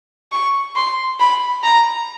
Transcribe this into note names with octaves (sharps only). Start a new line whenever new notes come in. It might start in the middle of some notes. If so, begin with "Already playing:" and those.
C#6
C6
B5
A#5